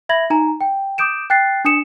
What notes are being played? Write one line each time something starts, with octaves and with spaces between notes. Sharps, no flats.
E5 B5 G#6 A#6 F#7
D#4 G#5 A#5
G5
D6 D#6 G6 D7 E7
G5 F#6 A6 C7
D4 G#5 D#6 C#7 E7